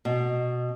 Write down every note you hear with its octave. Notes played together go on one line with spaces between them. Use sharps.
B2